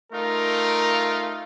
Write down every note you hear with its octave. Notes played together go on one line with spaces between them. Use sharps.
A3 D#4 F4 A#4